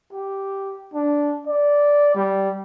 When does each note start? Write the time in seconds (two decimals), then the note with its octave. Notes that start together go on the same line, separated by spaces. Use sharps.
0.12 G4
0.94 D4
1.47 D5
2.15 G3